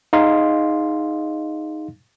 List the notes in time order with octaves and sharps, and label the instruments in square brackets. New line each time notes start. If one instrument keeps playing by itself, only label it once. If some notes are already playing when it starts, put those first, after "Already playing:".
[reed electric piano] D#4 G#4 D#5 F5 C6